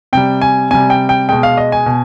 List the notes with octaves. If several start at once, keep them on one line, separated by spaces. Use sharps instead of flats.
C3 G3 G5
G#5
C3 G3 G#5
G5
G5
B2 G#3 G5
F5
D#5
G#5
B2